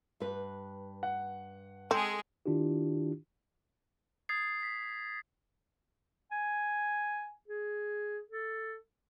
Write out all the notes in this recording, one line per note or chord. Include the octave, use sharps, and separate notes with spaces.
G2 B4
F#5
G#3 C4 G#4 A4
D#3 D4 E4 F4 G4
D#6 G#6 A6 C7
B6
G#5
G#4
A4